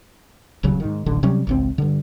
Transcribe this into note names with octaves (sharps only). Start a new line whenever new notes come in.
D#1 C2 C#3 F#3
G#2 D#3
D1 A1 D3
C3 F#3 G3 C#4
G#1 C#2 C4
G2 D3